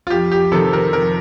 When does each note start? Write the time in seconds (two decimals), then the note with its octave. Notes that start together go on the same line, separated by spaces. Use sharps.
0.07 F4
0.10 F2 G4
0.32 G4
0.52 C3 D#3 A4
0.73 A#4
0.93 F2 A#4